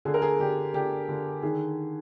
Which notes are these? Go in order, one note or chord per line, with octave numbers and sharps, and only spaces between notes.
D3 G#4
A#4
G#4
D3 G4
D3 G4
D3
D#3 G#4